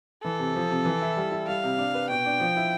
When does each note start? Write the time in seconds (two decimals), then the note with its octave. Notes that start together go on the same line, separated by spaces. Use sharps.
0.24 E3 A4
0.39 C3
0.55 F3
0.70 C3
0.85 E3
1.02 E4
1.17 G3
1.32 E4
1.47 G3 F5
1.64 C3
1.78 D4
1.94 B4
2.10 B2 G5
2.26 D4
2.40 F3
2.56 E4